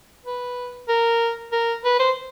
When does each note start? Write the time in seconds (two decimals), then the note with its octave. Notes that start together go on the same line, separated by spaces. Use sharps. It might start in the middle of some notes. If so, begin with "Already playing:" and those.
0.25 B4
0.88 A#4
1.52 A#4
1.84 B4
1.99 C5